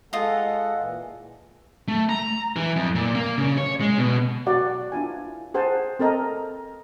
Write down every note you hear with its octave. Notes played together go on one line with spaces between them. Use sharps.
G#3 F4 A4 D#5 F#5
A#2 E3
A3
A#5
E3
F2
A#2
A#3
C#3
C#5
G#3
B2
F#4 D5 F#5
D4 E4 F4 G#5
G#4 C5 F#5 G#5 A5
C4 A4 A#4 D#5 A#5